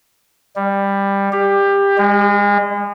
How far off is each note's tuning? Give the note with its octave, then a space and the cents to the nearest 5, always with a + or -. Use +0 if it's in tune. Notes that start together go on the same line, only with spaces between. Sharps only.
G3 +15
G4 +20
G#3 -35